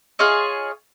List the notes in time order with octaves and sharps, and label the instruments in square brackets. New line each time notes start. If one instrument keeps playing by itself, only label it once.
[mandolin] F4 G#4 C#5 D#5